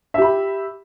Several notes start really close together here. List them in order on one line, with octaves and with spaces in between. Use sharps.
E5 G4 B5